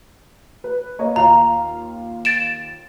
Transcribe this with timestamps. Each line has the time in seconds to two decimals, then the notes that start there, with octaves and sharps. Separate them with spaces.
0.64 B4
0.99 A#3 C#5 D#5
1.16 D#2 F4 F5 A#5
2.25 A6 D7 E7